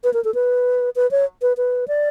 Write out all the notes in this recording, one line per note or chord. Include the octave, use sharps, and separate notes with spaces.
B4
A#4
A4
B4
B4
C#5
B4
B4
D5